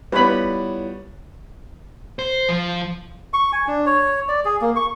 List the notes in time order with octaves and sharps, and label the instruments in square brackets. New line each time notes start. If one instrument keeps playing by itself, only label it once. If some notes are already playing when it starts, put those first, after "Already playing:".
[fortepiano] G3 B3 [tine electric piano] E4 F4 C#5 [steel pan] B4 B5
[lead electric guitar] C5
F3
[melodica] C#6
G#5
D4
C#5
D5
G#4
A#3
C#6